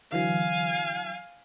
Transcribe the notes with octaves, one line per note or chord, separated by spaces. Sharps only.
D3 E3 F#3 F5 G#5